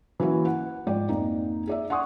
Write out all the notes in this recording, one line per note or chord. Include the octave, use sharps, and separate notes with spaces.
E3 F#3 A#3 C#4 E4 F#4
F#5
G#2 F3 D5 G5
F2 A#3 D#4
G#4 D5 E5
F#5 G#5 C6 C#6 D#6